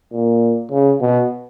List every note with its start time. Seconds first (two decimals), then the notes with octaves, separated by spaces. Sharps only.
0.12 A#2
0.71 C#3
1.01 B2